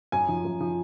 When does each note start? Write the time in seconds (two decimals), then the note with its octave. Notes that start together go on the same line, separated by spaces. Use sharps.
0.12 F#2 G#5
0.29 F3
0.45 F#2
0.61 F3